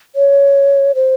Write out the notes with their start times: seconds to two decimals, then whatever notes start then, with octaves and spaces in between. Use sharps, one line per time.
0.16 C#5
0.95 C5